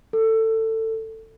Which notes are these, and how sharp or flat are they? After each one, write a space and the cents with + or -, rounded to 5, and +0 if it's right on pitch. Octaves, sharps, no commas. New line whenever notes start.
A4 +20